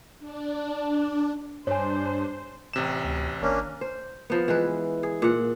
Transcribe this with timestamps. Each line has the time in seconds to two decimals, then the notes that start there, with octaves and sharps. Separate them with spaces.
0.19 D4
1.67 G2 D4 C5 C#5 G#5
2.73 A1 C3 E7
3.05 D2
3.42 G#1 A#3 C#4 D4
3.81 C5
4.30 F3 B3
4.48 E3 G#3 B4
5.03 G#4
5.22 A#2 F#5